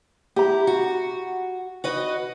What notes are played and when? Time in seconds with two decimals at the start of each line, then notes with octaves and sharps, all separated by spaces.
0.36 E4 G4 A#5
0.67 F#4
1.84 F#4 B4 D#5